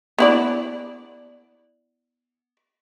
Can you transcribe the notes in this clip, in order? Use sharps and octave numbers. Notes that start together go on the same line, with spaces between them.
B3 E4 D5